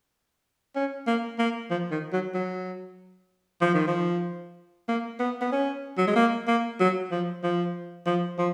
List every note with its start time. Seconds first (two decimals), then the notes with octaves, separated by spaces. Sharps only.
0.76 C#4
1.07 A#3
1.39 A#3
1.70 F3
1.91 D#3
2.13 F#3
2.34 F#3
3.61 F3
3.74 D#3
3.87 F3
4.89 A#3
5.20 B3
5.41 B3
5.52 C#4
5.98 F#3
6.07 G#3
6.16 A#3
6.47 A#3
6.80 F#3
7.11 F3
7.43 F3
8.06 F3
8.38 F3